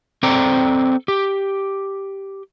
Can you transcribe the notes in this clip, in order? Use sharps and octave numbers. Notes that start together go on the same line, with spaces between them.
C4 A4 C5 D5 G5 A#5
G4